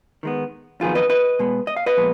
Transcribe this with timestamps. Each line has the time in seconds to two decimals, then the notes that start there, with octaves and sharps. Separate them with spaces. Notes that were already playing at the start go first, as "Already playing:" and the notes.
0.23 D#3 G#3 B3
0.81 F2 D#3 F#3 B3 D#4 F4 G#4
0.95 B4 D#5
1.10 B4 D#5
1.39 B2 G#3 B3
1.67 D#5
1.77 F5
1.86 B4 D#5
1.97 A#2 F3 G#3 B3